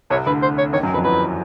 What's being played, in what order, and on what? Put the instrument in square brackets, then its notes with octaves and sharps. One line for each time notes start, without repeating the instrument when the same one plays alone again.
[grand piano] C2 C3 [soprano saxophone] C#5
[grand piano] D2 D3 [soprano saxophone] B4
[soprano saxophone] C5
C#5
[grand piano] D#2 D#3 [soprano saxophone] C#5
[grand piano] F#2 F#3
[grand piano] F2 F3 [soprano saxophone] B4
[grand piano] E2 E3 [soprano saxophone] B4